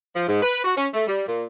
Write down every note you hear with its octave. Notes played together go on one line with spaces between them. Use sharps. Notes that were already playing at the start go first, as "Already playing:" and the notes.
F3
G#2
B4
F#4
C#4
A3
G3
A#2